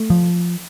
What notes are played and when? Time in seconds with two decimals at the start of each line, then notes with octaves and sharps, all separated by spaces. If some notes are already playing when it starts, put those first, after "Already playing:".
Already playing: A3
0.10 F3